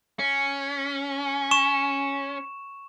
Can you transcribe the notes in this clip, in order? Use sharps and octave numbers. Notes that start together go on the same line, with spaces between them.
C#4
C#6 E7